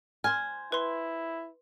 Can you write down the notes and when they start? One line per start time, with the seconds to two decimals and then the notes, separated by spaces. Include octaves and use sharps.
0.24 C5 G#5 F6
0.72 E4 B4 C6